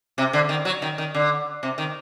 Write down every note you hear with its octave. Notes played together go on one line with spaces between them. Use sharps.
C3
D3
D#3
F#3
D#3
D#3
D3
C3
D#3